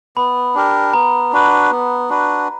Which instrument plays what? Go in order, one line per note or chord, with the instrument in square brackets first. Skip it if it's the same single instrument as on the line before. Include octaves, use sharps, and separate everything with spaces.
[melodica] B3 [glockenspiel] B5
[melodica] D4 G4 A#4
[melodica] B3 [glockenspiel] A#5
[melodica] D4 F#4 B4
B3
D4 F#4 B4